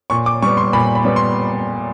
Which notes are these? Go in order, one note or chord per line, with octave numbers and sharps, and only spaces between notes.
A#2 C#6
D6
G3 B3 C#6
C6
A#2 B5
B5
G3 B3
C6